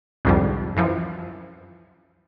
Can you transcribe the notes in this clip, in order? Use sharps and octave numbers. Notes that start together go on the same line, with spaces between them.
C2 F2 G#2 D3 F3 G3
F#2 E3 F3